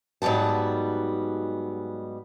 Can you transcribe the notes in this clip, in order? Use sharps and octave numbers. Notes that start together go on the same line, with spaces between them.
G#2 F#3 G3 B3 A5